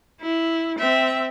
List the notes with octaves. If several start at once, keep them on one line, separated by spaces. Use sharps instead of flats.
E4
C4 E5